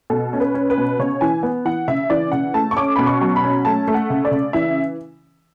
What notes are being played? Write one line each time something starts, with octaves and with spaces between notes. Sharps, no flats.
B2 A4
C#4
B4
C#4
B4
B2
C#3 C#5
E3 G#5
B3
E3 F#5
C#3 E5
E3 D5
C#3 F#5
A3 A5
C#6
C#4 D6
B2 B5
C#6
F#3
B5
C#4
A3 A5
A3
F#5
C#3
D5
C#3
E3 E5